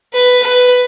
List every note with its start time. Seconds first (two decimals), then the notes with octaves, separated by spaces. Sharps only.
0.13 B4
0.42 B4